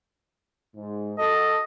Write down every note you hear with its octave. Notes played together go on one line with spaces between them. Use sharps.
G#2
F#4 A4 D#5